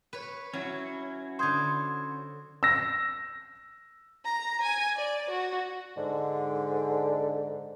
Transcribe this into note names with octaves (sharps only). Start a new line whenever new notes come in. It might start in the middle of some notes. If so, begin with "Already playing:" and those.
B4 C#5
F#3 C#4 E4 F#4
D3 C5 C6 D#6 G#6
E6 A#6
A#5
G#5
D5
F#4
G#2 D3